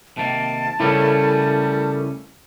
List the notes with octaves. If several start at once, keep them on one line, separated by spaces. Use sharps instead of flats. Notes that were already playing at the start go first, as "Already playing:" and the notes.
C3 D#3 A#3 A5
C#3 G3 A3 C#4 E4 A4 A#4